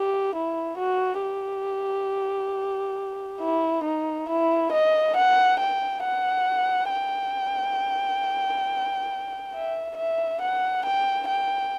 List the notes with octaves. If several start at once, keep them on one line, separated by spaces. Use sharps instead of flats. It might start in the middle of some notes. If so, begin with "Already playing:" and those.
Already playing: G4
E4
F#4
G4
E4
D#4
E4
D#5
F#5
G5
F#5
G5
E5
E5
F#5
G5
G5